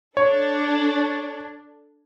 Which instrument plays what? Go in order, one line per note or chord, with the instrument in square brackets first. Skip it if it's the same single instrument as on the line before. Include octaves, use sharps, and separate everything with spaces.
[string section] D4 A4 [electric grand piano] C#5